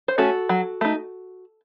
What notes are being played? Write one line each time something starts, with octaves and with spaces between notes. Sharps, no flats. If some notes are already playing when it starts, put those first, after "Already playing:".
C5
A3 C#4 F#4 A4
F#3
A3 D#4